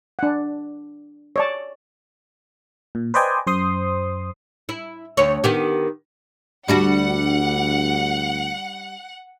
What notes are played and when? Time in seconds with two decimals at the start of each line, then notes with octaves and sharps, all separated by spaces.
0.19 D4 F#5
1.36 C#5 D5 A5
2.95 A#2
3.14 B4 C5 D5 D#5 G5 G#5
3.47 F#2 C5 C6 D#6
4.69 E4
5.17 D2 C#5
5.44 D#3 B3 G4
6.68 D2 G3 D4 F#4 F#5